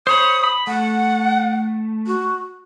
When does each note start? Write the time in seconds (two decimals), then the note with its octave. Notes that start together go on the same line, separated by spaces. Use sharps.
0.07 C5 C#5 B5 D#6
0.44 B5
0.67 A3 F#5
2.07 F#4